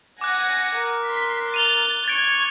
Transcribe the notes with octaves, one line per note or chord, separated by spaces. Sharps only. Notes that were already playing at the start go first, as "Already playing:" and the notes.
F#5 G#5 D6 F#6 A#6
A#4
C6 B6
A6 D#7 F7 G7
C#6 G#6 A6 D7